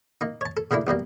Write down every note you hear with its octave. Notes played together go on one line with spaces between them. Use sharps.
A#3 D#4
C#5 A5
A4
C#3 A3 A#3 D4 E4
B1 B2 G3 A#3